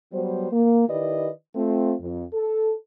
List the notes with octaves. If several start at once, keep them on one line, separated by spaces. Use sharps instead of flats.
F#3 G3 B3 C5
A#3
D#3 E4 G4 B4 D5 D#5
A3 C4 F4
F2
A4